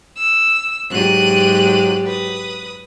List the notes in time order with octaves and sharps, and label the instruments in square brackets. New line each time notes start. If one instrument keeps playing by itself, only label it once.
[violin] E6
[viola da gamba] G#2 F#3 G4 [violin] F#6 D#7
[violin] B4 D#6